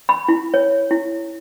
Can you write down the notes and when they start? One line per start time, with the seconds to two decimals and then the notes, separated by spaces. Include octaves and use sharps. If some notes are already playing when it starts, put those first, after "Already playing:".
0.09 B5
0.28 E4
0.54 C#5
0.91 E4